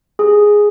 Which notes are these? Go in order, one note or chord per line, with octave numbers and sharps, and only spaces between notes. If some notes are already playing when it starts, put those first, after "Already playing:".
G#4